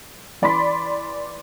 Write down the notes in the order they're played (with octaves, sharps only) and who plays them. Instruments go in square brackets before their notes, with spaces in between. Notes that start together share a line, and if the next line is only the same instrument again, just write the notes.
[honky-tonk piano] E3 D5 B5 C6 B6